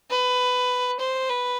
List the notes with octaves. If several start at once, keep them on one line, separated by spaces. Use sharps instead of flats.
B4
C5
B4